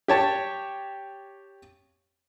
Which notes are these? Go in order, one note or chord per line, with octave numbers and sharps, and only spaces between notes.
G4 C#5 A5